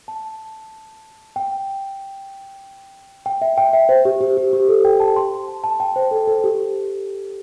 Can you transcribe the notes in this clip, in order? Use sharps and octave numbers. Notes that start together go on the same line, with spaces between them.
A5
G5
G5
E5
G5
E5
C5
G4
G4
G4
G4
A4
G5
A5
C6
A5
A5
G5
C5
A4
A4
A4
G4